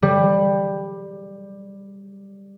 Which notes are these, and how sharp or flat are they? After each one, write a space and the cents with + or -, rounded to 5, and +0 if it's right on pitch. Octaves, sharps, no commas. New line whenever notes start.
G3 +10